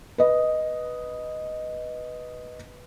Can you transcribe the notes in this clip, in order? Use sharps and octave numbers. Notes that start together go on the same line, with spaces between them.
B4 D#5